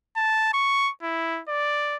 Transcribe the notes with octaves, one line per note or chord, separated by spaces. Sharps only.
A5
C#6
E4
D5